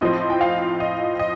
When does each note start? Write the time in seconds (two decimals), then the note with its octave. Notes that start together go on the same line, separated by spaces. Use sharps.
0.01 A2 F3 C4 D#5
0.30 G5
0.41 F5
0.80 D#5
1.19 D#5